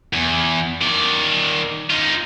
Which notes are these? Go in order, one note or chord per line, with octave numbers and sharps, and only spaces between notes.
E2
D#3 D5
D#4 F4